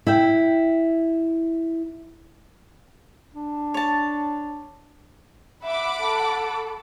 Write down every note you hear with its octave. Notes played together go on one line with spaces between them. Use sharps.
E4 E5 G5
D4
C#5 A5
E5 F#5 B5 D6
A4